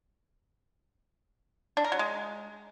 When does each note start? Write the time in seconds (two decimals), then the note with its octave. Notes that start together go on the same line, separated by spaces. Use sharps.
1.77 D4
1.84 A#4
1.92 F#3
1.99 G#3